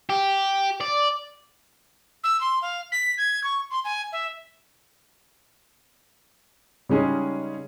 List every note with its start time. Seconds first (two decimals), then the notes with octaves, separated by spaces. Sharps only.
0.09 G4
0.81 D5
2.24 E6
2.41 C6
2.62 F5
2.92 B6
3.18 G#6
3.44 C#6
3.71 C6
3.85 G#5
4.12 E5
6.89 C#3 G3 G#3 C#4 D#4 G#4